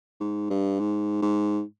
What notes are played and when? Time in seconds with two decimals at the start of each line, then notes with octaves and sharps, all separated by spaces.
0.20 G#2
0.50 G2
0.80 G#2
1.22 G#2